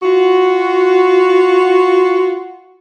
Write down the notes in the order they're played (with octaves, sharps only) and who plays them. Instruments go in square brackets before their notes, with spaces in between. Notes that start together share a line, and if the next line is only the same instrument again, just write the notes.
[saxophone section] F4 F#4